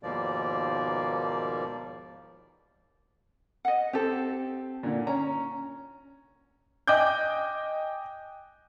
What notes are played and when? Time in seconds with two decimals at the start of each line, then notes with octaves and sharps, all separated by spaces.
0.03 D#2 G#2 B2 F3 A#3 D5
3.65 D#5 F#5
3.93 C4 G4 A4
4.83 A#2 D3
5.07 C#4 A#5
6.87 D#5 G5 G#5 D6 F#6 G6